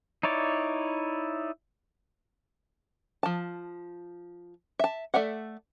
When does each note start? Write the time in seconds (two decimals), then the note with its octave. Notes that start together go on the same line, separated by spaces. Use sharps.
0.23 D#4 E4 C#5 D5
3.23 F3 A5
4.79 E5 A5
5.14 A3 D5 E5 F#5